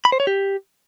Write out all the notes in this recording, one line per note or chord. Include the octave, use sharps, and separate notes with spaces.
B5
C5
C#5
G4